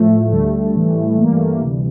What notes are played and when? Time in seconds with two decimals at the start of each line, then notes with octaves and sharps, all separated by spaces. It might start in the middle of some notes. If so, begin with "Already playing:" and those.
Already playing: A2 F3 A3
0.31 D2 D3 G3 A3
0.75 A2 E3 G3
1.18 G2 E3 G3 A#3
1.31 A3
1.44 A#3
1.62 D2 C3 E3 G3